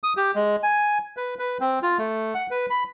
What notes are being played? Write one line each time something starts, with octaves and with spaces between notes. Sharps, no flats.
D#6
G4
G#3
G#5
B4
B4
C4
F4
A3
F#5
B4
B5